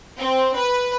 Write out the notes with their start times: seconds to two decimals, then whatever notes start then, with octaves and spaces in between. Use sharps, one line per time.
0.18 C4
0.56 B4